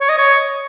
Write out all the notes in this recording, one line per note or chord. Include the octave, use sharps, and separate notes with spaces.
C#5
D#5
C#5